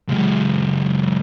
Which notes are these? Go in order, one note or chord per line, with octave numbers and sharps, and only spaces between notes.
C#2 F#2